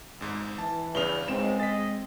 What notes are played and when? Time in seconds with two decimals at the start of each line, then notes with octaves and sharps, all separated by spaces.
0.21 G#1 G#2
0.58 E3 A5
0.95 E2 G2 C#3 F7 G7
1.28 C#2 G#2 G#3 C4 E7
1.60 G#4 D#5 A6 B6